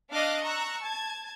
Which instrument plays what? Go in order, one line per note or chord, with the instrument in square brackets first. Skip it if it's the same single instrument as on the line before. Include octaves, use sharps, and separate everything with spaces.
[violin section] D4 D#5 F5 D6 F6 F#6
A#5 C#6 E6 F#6
A5 G#6